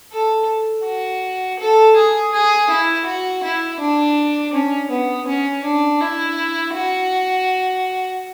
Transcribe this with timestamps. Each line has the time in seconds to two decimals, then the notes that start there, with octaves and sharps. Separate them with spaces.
0.12 A4
0.85 F#4
1.59 A4
1.96 G#4
2.32 G#4
2.70 E4
3.06 F#4
3.43 E4
3.80 D4
4.53 C#4
4.90 B3
5.27 C#4
5.64 D4
6.00 E4
6.74 F#4